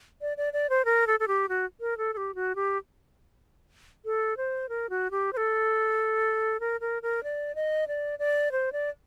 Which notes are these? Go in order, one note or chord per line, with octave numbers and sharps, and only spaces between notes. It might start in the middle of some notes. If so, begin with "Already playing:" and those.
D5
D5
D5
C5
A#4
A4
A4
G4
F#4
A#4
A4
A4
G4
F#4
G4
A4
C5
A#4
F#4
G4
C5
A4
A#4
A#4
A#4
D5
D#5
D5
D5
C5
D5